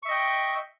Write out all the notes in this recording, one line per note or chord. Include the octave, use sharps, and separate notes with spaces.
D#5 E5 G5 C#6